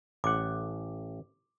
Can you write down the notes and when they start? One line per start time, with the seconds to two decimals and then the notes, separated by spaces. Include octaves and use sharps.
0.24 A1 F#5 D6